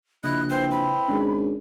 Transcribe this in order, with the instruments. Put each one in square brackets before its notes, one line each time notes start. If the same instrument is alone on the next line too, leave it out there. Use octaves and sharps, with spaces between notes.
[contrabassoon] A#1 [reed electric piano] C#3 [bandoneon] E4 D#5 [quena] F#6
[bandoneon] E3 C4 [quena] C5
[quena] B5
[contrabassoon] G#1 [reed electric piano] C#4 D4 G#4